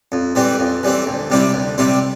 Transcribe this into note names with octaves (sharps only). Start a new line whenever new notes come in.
F2
E3 G3 C4
F2
E3 G3 C4
D2
C3 G3 C4 E4
D2
C3 G3 C4 E4